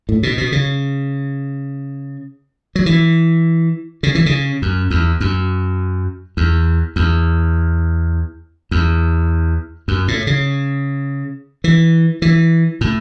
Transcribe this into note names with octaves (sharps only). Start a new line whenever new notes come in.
A2
B2
B2
C#3
F#3
E3
C#3
E3
C#3
F#2
E2
F#2
E2
E2
E2
F#2
A2
C#3
E3
E3
A2